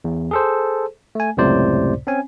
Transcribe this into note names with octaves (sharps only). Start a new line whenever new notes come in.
E2
G#4 A4 C5
A3 G#5
C#2 F#2 A2 C3 C5 D5
C4 C#4 G#5